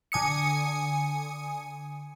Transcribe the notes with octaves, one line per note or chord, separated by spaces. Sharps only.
D3 G#5 D#6 C#7